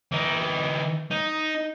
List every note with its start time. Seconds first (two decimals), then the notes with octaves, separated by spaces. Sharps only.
0.12 E3 D#4
1.11 D#4